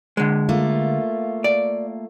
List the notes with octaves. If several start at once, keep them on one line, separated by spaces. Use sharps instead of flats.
D3 G#3
A3 A#3 F4
D5